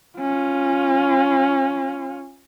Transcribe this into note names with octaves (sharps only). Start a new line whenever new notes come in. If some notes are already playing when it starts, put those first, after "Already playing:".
C#4 F4